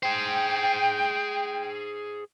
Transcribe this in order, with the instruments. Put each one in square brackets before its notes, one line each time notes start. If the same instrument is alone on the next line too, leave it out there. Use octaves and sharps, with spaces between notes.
[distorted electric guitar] G#4 C5 [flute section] G5